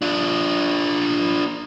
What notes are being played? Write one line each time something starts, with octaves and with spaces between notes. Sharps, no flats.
D4 F4